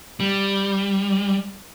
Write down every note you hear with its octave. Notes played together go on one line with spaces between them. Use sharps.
G3